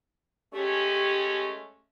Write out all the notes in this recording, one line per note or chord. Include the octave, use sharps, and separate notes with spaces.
G#3 A3 C#4 G4